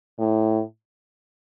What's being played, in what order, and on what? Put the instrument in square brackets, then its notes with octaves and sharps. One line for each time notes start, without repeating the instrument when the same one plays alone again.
[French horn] A2